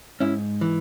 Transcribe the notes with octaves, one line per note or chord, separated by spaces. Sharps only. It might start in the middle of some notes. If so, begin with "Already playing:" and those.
G#2 C#4 E4
E3